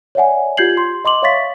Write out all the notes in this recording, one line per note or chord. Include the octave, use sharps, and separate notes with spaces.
C#5 D5 E5 F#5 G#5
F4 G4 G6 G#6 C7 F#7
C6
D#5 C6 D6 F#7
C#5 E5 F5 C#6 A6 B6